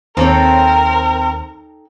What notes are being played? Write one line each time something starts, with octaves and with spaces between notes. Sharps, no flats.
D#2 C4 D#4 A4 A#4 C#5